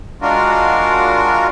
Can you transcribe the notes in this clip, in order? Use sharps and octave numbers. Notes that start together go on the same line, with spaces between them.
G#3 D4 F4 F#4 A#4